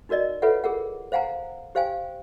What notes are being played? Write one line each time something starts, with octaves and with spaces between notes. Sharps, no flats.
D#4 F#4 A#4 D5 D#5
F4 A4 B4 C#5 E5 F#5
G#4 A#4 F#5
C5 F5 F#5 G#5 A#5
G4 C5 F5 G5 G#5